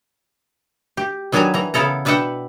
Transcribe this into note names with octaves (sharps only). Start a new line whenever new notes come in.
G4
D#3 F#3 D4 B4 G#5 A#5
E3 A#5
C#3 B3 E4 A4 A#5
B2 D4 B4 E5 F#5 G5